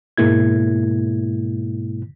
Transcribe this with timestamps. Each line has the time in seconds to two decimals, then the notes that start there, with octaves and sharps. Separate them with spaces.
0.18 G#2 B2 G#3 A#3 E4 G#6